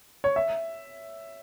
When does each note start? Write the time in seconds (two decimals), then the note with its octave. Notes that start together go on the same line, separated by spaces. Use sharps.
0.24 C#5
0.36 E5